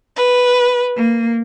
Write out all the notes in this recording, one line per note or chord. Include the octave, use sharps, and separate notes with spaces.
B4
A#3